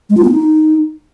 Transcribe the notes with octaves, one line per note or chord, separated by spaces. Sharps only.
G#3
F4
B3
D#4